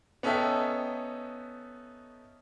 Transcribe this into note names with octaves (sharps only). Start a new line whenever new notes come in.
B3 C#4 D#4 A4 E5 G5